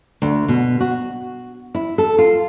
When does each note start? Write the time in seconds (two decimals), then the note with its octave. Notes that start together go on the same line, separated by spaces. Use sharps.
0.22 D2
0.48 B2
0.80 F#4
1.75 E4
1.98 A4
2.18 F4